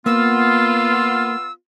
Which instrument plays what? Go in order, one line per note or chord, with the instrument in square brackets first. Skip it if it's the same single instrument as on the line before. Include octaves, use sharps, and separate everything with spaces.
[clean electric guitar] A#3 [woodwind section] B3 F4 [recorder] E6